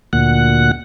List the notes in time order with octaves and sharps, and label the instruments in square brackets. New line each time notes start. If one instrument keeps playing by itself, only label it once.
[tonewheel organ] D2 A#2 F#5